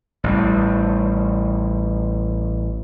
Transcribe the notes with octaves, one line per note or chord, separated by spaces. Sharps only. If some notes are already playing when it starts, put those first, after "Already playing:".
A1 A2 G3